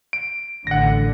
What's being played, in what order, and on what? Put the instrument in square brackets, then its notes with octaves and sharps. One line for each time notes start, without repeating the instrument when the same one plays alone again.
[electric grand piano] D7
[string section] A1 D3 [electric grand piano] F#5 A#6